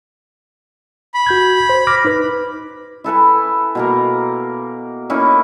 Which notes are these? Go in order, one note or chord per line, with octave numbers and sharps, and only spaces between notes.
B5
F#4 G6 G#6
C5
D6 F6 A#6
D#4 B4
E4 A4 B4 G#5
B2 A#3 A#4
A#3 C#4 D#4 E4